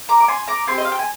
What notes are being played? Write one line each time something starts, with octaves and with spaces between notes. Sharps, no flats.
A#5 D6
D6
G#5 C6
A#5 D6
C4 G4 G#5 C6
D#5
F5
G5
G#5